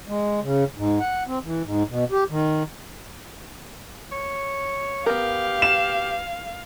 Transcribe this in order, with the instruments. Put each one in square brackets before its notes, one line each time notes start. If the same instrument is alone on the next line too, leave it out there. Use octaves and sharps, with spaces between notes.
[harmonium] G#3
C#3
G#2
F#5
C4
E3
G#2
B2
G4
D#3
[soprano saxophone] C#5
[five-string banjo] B3 A#4 [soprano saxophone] G4 [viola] F5
[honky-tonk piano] E7